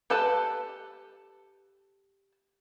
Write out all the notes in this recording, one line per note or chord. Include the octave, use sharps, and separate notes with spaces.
G4 A4 B4 A5